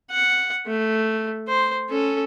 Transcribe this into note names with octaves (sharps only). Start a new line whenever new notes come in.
F#5
A3
C5
C#4 A4